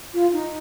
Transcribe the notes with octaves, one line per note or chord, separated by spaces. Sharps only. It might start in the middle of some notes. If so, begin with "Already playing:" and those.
F4
D#4